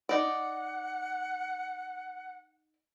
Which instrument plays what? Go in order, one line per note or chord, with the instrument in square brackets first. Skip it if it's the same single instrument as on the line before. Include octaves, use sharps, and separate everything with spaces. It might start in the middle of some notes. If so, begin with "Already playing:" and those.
[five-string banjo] D#4 D5 [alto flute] F#5